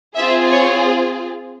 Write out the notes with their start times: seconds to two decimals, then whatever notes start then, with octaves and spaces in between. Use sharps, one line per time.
0.16 C4 F4 G#4 E5
0.50 C#5